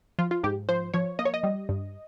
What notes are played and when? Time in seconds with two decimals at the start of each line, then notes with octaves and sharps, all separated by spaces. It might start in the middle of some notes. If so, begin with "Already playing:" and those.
0.19 F3 F4
0.31 F4
0.44 G#2 G4
0.69 F3 C5
0.94 F3 C#5
1.19 A#3 D#5
1.25 C#5
1.34 D#5
1.44 G3
1.69 G2